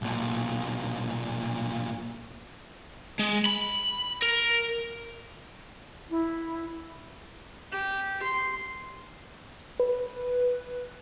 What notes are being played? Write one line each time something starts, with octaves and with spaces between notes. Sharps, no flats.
B1 A#2
G#3
B5
A#4
E4
G4
C6
B4